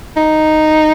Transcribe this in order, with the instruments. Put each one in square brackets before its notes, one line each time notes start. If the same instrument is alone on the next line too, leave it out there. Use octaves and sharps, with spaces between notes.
[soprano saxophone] D#4